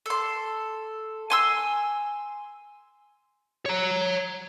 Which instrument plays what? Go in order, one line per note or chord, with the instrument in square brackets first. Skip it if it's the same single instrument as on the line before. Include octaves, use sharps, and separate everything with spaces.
[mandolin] A4 C6
G#5 C6 E6
[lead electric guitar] C#5 A#5